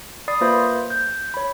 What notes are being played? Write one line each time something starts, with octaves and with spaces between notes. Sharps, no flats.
D5 B5 D#6 A6 C7
A#3 F4 B4 C5 E5 B5
G6
C#5 B5